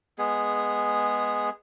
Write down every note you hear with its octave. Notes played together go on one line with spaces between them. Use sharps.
G#3 B3 G#4